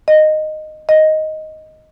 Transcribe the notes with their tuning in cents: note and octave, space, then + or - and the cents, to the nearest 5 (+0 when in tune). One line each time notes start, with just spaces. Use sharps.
D#5 -10
D#5 +5